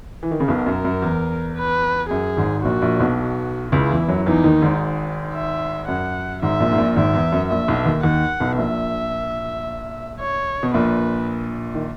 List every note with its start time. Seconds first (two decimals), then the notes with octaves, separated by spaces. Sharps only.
0.23 E3
0.31 D#3
0.40 C#3
0.48 B1 B2 A#4
0.66 F#2
0.85 F#2
1.02 E2
1.56 B4
2.10 F#2 G#4
2.37 G#1 G#2
2.64 A#1 A#2 F#4
2.82 A#1 A#2
3.00 B1 B2
3.18 F#4
3.72 C#2 C#3 E4
3.90 E2 E3
4.08 F#2 F#3
4.26 E2 E3 D#4
4.44 D#2 D#3
4.62 G#1 G#2
5.34 E5
5.88 F#2 F#5
6.42 G#1 G#2 E5
6.60 A#1 A#2
6.72 G#2
6.78 A#1 A#2
6.96 G#1 G#2 E5
7.14 E2
7.32 F#2
7.49 A#1 A#2 E5
7.68 B1 B2
7.85 D#2 D#3
8.03 D#2 D#3 F#5
8.40 B1 B2
8.53 B2
8.58 A#1 A#2 E5
10.20 C#5
10.63 B2
10.74 A#1 A#2 B4
11.75 D#3